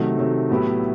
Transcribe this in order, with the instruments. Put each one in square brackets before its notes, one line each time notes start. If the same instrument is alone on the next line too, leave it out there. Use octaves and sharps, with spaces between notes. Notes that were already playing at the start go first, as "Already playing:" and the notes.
Already playing: [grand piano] C3 D#3 F#3 A3
C3 D#3 F#3 A3
A2 F#3 B3 E4 G4